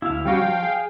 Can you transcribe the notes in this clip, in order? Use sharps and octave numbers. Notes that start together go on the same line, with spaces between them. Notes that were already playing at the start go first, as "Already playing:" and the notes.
D2 E4 F5
G3 C#4 F#4 F5 G5
F3
G#4